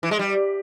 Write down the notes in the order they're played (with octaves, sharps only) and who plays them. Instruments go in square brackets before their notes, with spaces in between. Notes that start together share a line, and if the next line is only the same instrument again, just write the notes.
[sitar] E3
G#3
G3